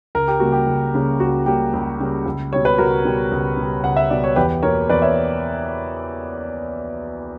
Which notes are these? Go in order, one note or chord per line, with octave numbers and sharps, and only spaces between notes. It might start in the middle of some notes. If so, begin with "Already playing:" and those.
C#2 A#4
G4
C#3 G3 A#3 F#4
G4
C#2
C#3 G3 A#3
C#2 F#4
C#3 G3 A#3 G4
C#2
C#3 G3 A#3
C#2
B2 G3 C#5
B4
C#2 F#4 A#4
B2 G3
C#2
B2 G3
C#2 F#5
E5
B2 G3 D5
C#5
E2 G4 B4
B2 A#3 A#4 C#5
E2 B4 D5
C#5 E5